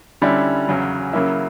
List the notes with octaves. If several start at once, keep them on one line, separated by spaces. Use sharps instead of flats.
D3 G3 C#4 E4
E2 C#3 F#3 C#4
C#3 F#3 A#3 E4